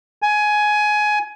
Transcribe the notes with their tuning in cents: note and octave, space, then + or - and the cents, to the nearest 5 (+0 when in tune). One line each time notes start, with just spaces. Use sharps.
G#5 +15